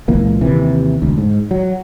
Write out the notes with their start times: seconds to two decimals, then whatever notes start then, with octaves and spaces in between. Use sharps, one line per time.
0.08 C#2 A#2 E3 A#3
0.41 D#2 C3 E3
1.02 E1 D2
1.18 G#2
1.51 F#3